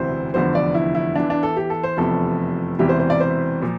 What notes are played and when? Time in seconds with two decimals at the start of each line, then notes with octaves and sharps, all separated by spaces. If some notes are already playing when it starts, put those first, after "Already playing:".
Already playing: E1 D2 C3 E3 C5
0.34 F1 E2 D3 F3 C5
0.55 D5
0.75 E4
0.95 E4
1.15 E2 E3 D4
1.30 D4
1.43 A4
1.57 G4
1.70 A4
1.83 C5
1.97 F1 E2 C3 F3 A4
2.79 E1 E2 C3 E3 G4
2.89 C5
2.99 C5
3.10 D5
3.20 C5
3.62 A#2 F3